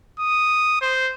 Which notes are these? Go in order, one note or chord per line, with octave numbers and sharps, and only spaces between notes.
D#6
C5